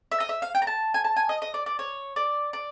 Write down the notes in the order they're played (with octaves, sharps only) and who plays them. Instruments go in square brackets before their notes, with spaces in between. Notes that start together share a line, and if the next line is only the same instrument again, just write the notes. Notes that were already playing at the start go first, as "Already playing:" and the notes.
[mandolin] E5
D#5
E5
F5
G5
A#5
A5
G#5
A5
G#5
D#5
D#5
D5
D5
C#5
D5
D5